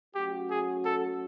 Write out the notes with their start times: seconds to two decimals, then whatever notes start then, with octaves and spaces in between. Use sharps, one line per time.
0.15 F#3 A3 C#4 F#4 G4
0.50 G#4
0.85 A4